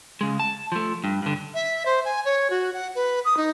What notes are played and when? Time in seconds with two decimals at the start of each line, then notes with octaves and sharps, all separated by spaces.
0.21 C#3 G#3
0.40 A5
0.72 F3 A3
1.04 G2
1.22 G2 D3
1.54 E5
1.86 C5
2.05 G#5
2.25 C#5
2.50 F#4
2.74 F#5
2.95 B4
3.25 D#6
3.37 D#4